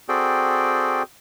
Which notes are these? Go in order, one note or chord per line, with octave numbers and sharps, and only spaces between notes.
C4 F#4 G#4 A4 D5 G5